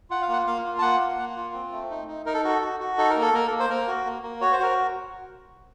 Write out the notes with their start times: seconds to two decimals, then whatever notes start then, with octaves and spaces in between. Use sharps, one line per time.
0.10 F4 F#5
0.22 F5
0.28 A#3 F#5
0.47 A#3 F5
0.65 F4
0.79 A5
0.82 A#3 F#5
1.00 A#3
1.19 A#3
1.36 F4
1.54 C4
1.72 A3
1.90 D#4
2.08 D#4
2.26 D#4 A#4
2.34 A4
2.44 F#4 A4
2.62 F#4
2.80 F#4
2.98 D#4 A4
3.10 A#4
3.16 A#3
3.22 A4
3.33 A#3 A#4
3.47 A4
3.51 A#3
3.60 C5
3.70 A#3 A#4
3.88 F#4
4.06 A#3
4.23 A#3
4.41 F#4 C#5
4.52 C5
4.59 F#4 A#4